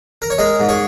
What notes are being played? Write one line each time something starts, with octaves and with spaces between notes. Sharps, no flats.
A#4
C#5
G#3 A#4 D#5
G#2
G#4 C#5